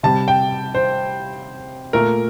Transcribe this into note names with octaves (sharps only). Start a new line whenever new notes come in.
C3 G3 A5
G5
C5
A#2 A3 A#4